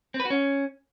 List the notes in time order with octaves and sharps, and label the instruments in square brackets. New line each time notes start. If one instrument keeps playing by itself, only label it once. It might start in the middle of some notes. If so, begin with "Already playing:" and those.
[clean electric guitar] C4
B4
F#4
C#4